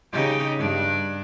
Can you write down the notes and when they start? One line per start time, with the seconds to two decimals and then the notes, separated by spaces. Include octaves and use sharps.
0.13 C#3 D#4 G4
0.58 G2 D4